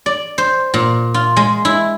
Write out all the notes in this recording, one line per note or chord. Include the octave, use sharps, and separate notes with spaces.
D5
C5
A#2
F4
G#3
E4